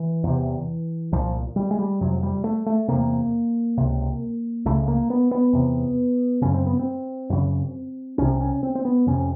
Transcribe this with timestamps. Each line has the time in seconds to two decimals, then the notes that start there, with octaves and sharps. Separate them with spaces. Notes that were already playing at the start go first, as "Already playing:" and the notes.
Already playing: E3
0.24 E2 C3
1.12 C2 A#2 F3
1.56 G3
1.71 G#3
1.79 G3
2.01 F2 C3 F#3
2.23 G3
2.44 A3
2.66 A3
2.88 E2 C3 A#3
3.78 C#2 C3
4.65 C#2 C#3 A3
4.88 A#3
5.10 B3
5.31 B3
5.53 E2 C3
6.42 F#2 C#3 C#4
6.54 C4
6.66 B3
6.79 C4
7.30 F#2 C#3
8.18 C2 C3 C#4
8.41 C#4
8.63 C4
8.75 C4
8.85 B3
9.07 F2 C3 C#4